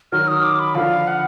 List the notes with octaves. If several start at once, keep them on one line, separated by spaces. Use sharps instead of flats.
D#3 F#3 F6
D#6
D6
B5
D3 F3 F5
F#5